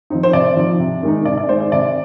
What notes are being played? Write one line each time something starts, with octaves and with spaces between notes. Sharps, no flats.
F3 C4 D#4
C5
C3 D5
F3 C4 D#4
C3
D#3 G#3 D#4
C3 D5
D5
D#3 G#3 D#4 C5
D5
C3 D5